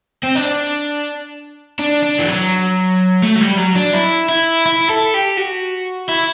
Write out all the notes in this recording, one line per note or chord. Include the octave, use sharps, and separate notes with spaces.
C4
D4
D4
D4
E3
F#3
A3
F#3
G3
F#3
D4
E4
E4
E4
A4
G4
F#4
E4